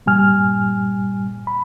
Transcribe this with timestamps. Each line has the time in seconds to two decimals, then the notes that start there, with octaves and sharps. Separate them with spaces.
0.06 G2 A#2 G3 G#5 F6
1.47 B5